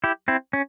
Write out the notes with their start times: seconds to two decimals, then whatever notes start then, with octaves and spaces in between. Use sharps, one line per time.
0.04 E4 G4
0.28 C4 E4
0.53 C#4